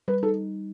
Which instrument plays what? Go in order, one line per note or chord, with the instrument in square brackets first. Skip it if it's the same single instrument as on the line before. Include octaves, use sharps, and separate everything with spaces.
[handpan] G3 [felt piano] B4
[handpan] D#4 [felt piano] A4